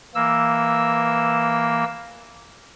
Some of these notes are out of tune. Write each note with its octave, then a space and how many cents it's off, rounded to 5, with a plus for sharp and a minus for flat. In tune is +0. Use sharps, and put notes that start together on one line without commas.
E3 +0 A#3 +0 E6 +0